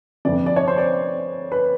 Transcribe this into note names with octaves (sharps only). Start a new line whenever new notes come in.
G1 F2 C3 D5
D5
C#5
C5
D5
B4